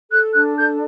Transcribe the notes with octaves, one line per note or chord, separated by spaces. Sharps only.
A4 F#6
D4 F#6
A4 G6